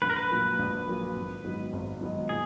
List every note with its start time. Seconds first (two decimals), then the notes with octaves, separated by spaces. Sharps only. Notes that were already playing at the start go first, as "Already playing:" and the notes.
0.02 A#1 B4
0.10 A#4
0.16 B4
0.30 A#2 F#3 A#3
0.59 A#1
0.88 A#2 F#3 A#3
1.16 G#1
1.44 G#2 D#3 F#3 B3
1.73 G#1
2.01 G#2 D#3 F#3 B3
2.29 A#2 G#4